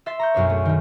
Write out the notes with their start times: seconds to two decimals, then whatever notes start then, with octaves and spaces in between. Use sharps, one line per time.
0.06 E5 C6 A6
0.19 A#5 C#6 G6
0.34 B1 F#2 D4 C#5
0.50 A3 G#4
0.65 D#3 A3